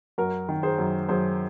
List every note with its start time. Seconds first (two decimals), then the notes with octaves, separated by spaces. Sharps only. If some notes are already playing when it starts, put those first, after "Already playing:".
0.18 F#2 F#4 A#4
0.49 D#3
0.63 G#4 C5
0.78 F#2
1.09 F#2 G#4 C5